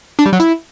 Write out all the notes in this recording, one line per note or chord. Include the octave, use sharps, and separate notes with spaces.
D4
G3
F#3
E4